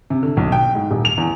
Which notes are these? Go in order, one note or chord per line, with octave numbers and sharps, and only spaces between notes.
C3
D3
B1
G5
G#2
D#1
F7
E2